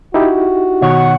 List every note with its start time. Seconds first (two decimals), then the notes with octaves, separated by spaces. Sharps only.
0.14 D#4 E4 F#4 G4
0.82 B2 D#3 C#5 F#5